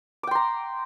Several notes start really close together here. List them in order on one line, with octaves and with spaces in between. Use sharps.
D6 G5 C6 A#5